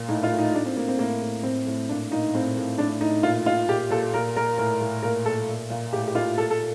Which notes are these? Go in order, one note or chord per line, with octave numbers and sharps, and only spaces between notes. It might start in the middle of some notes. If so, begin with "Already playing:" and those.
Already playing: A#2
A2 D#4
F4
A2
D#4
A2 D4
C4
A2 A#3
C4
A2 A#3
A2
A2 C4
A2
A#2 D4
A#2 D#4
A2 C4
A2
A2 D4
A2 D#4
A#2 F4
A#2 F4
A#2 G4
A#2 A4
A#2 A#4
A#2 A#4
A2 A#4
A2
A#2 A#4
A#2 A4
A#2
A#2
A2 G4
G4
A2 F4
A#2 A4
A4